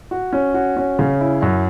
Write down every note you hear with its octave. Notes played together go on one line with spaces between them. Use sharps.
F#4
C#4
F#4
C#4
C#3
E4
F#2